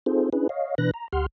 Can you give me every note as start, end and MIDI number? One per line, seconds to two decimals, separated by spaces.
0.06 0.30 60
0.06 0.30 63
0.06 0.30 65
0.06 0.30 68
0.06 0.30 69
0.06 0.30 72
0.33 0.48 61
0.33 0.48 62
0.33 0.48 64
0.33 0.48 68
0.33 0.48 71
0.49 0.75 73
0.49 0.75 75
0.49 0.75 77
0.78 0.91 47
0.78 0.91 52
0.78 0.91 62
0.78 0.91 71
0.78 0.91 90
0.78 0.91 94
0.94 1.08 82
1.13 1.26 38
1.13 1.26 67
1.13 1.26 78
1.13 1.26 84
1.13 1.26 89